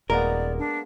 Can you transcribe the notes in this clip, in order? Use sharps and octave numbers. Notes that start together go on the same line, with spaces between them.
D#1 G#3 A#3 B3 A#4 D5
D4